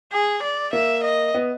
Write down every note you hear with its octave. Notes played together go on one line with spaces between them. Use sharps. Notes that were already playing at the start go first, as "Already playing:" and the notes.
G#4
D5
A#3 E5
D#5
B3